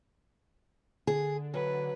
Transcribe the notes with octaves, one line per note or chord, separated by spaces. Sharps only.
D3 G#4
F#3 B4